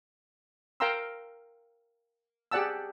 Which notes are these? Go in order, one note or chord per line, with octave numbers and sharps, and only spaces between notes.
A#4 F5 G5 A#5 C6 E6
G4 G#4 D5 F#5 A5 E6